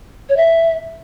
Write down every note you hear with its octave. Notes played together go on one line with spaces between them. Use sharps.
C#5
E5